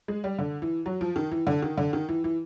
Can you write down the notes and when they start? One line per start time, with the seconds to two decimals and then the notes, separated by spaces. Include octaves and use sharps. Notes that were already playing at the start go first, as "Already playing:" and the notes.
0.08 G#3
0.24 G3
0.39 D3
0.62 E3
0.86 F#3
1.01 F3
1.16 D#3
1.31 E3
1.47 D3
1.62 D#3
1.78 D3
1.93 D#3
2.09 E3
2.24 E3